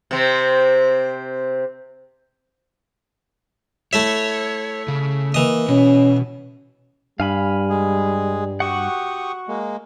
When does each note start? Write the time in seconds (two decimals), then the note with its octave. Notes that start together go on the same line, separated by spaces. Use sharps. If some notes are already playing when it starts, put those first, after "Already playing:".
0.11 C3 C4
3.93 A3 E4 C#5 E5
4.88 C#3
5.34 E3 A#3 D#5
5.68 B2 C#4
7.20 G2 G3 F5 G#5 B5
7.70 G#3 G#4
8.60 F#4 G4 F#5 C#6 D#6
9.48 G#3 A#3